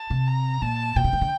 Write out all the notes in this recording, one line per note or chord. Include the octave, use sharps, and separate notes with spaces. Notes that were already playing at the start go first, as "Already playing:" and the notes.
Already playing: A5
C3
A#5
A#2 A5
A#2 G5
C3
E3
D3